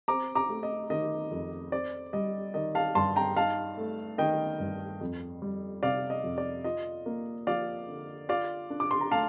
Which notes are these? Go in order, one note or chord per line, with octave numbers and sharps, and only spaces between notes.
C4 A#5 D6
A#5 D6
A3
D#5
D#3 D#5
F2
C4 D5
G3 D#5
D#3 D#5
F5 A5
G2 A5 C6
G5 A#5
D#4 F5 A5
A3
D#3 D#5 G5
G2
F2
G3
C3 D5 F5
D#5
F2
D5
F4 D#5
A#3
F3 D5 F5
D3
F4 D5 F5
D4
D6
C6
A#5
A3 F5 A5